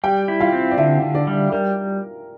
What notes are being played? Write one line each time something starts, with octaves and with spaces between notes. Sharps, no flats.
G3 G4 G5
E4
F4 F5
C4
D5
D3 E4 E5
D3
D4 D5
G3
G3 A#4